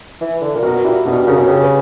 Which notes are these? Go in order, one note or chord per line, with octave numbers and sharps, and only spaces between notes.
E3
D3
A#2
B2 F#4 A#4
A#2 E4 G4
B2 D4 F#4
G4
C#3 F#4 A#4
B2 C#5
C#3 G4 B4
B4